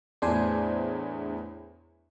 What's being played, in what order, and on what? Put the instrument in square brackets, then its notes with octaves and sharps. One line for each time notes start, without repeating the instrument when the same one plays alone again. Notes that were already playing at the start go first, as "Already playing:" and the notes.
[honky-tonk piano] E2 A2 [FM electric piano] D4 C5 G#5